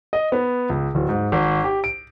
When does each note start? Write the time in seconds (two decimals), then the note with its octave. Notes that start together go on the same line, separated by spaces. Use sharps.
0.13 D#5
0.32 B3
0.69 C#2
0.95 D1
1.09 G#2
1.32 G#1
1.64 G4
1.84 D7